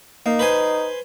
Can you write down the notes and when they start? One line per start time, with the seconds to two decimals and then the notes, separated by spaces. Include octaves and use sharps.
0.26 A#3 D#4
0.39 B4 C5 G#5